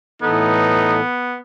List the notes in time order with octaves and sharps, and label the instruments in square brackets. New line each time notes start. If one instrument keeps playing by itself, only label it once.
[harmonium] A2 E3 A4 [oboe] B3 [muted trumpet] D#4